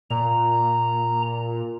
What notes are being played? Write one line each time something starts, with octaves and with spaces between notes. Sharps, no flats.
A#2 A#5